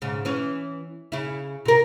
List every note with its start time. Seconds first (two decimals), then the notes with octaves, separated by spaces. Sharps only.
0.02 G#2 C#3
0.25 E3 C#4
1.12 C#3 E4
1.65 C3 A#4